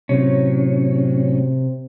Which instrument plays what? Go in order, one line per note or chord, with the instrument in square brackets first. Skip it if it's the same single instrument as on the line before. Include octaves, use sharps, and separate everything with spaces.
[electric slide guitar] A2 F#3 C#4 [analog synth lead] C3